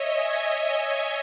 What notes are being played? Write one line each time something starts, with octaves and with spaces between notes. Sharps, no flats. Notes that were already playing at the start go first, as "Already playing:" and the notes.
Already playing: C#5 D#5 E5
G#5